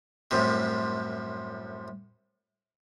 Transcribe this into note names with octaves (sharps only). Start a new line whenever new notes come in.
C2 F#2 A2 C3